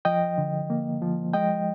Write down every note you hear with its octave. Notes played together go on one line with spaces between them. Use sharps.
F3 D#5 G5
D3
A#3
F3
G#3 D#5 G5